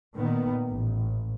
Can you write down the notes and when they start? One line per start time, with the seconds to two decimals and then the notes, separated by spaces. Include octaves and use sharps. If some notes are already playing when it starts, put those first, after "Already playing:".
0.15 A#2 D#3 B3
0.67 A1